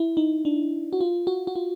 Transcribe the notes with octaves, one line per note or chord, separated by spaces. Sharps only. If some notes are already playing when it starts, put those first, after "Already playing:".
Already playing: E4
D#4
D4
F#4
F4
F#4
F#4
F4